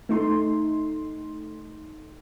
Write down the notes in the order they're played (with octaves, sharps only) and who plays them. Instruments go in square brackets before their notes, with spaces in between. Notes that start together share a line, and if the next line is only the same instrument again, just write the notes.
[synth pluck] A3 D#4 C6